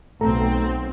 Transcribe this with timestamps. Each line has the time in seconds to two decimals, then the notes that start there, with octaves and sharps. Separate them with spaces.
0.21 B1 A3 C4 A4 A#5